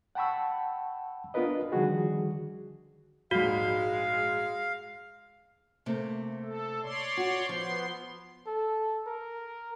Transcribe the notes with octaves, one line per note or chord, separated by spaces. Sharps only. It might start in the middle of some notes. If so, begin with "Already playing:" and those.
F#5 G5 A5 B5 C#6 E6
B3 D4 F4 A#4 B4 D#5
D3 D#3 F3 G3 F#4 G#4
A#1 G#2 G#3 F#4 F5
C3 A3 A#3
A4
C#5 D5 C6
F#4
F3 B3 C6
A4
A#4